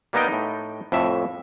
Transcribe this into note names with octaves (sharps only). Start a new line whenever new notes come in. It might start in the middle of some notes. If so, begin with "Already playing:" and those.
G3 A#3 B3 D#4 D#5 G5
A2 D#4
F2 A2 E5